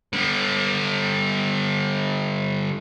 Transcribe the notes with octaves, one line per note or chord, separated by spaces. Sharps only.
D3 G3